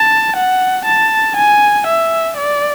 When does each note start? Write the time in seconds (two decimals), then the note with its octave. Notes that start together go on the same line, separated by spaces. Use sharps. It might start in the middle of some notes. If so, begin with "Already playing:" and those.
Already playing: A5
0.36 F#5
0.85 A5
1.36 G#5
1.87 E5
2.38 D5